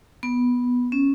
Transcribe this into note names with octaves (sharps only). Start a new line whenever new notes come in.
B3
C#4